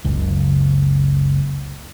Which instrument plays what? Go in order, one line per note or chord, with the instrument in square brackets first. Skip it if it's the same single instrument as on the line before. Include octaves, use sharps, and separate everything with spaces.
[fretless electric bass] F#1 C#2